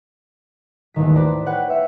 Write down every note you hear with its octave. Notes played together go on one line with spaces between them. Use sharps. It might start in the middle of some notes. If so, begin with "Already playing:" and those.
A1 D#2 D#3 B6
B4 C5 D5 A5 A#6 B6
B4 C#5 F#5 G5
B4 E5 F5